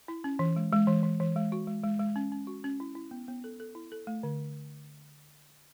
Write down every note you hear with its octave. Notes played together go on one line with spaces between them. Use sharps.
E4
C#4
E3
G#3
G#3
E3
E3
E3
G#3
F#4
G#3
G#3
G#3
C#4
C#4
F#4
C#4
E4
E4
B3
B3
A4
A4
E4
A4
A3
D3